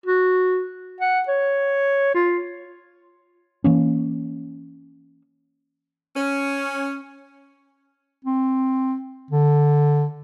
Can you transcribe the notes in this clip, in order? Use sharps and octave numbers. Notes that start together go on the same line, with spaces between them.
F#4
F#5
C#5
F4
E3 A#3 C#4
C#4
C4
D3